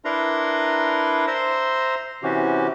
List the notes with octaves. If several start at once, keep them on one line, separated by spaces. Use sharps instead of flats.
D4 E4 A#4 B4 A#5 C6
C5 E5 A#5 C6
C3 E3 C#4 F#4 G4